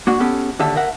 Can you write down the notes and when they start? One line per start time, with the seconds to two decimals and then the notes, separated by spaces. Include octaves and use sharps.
0.07 A#3 D4 F#4 F#5
0.20 B3 C#4 G4 A4
0.59 D#2 D3 G4 E5 A5
0.76 A#4 E5 F#5